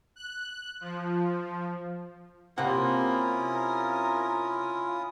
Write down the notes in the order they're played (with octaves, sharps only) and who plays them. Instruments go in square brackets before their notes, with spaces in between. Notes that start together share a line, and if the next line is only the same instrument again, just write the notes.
[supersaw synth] F#6
F3
[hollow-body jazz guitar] C3 C4 F#5 [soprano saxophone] A#3 [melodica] C#4 E4 D#6 [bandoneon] F4
[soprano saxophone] A#4